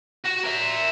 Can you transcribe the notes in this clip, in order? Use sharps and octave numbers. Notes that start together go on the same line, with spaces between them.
F#4
A#4 E5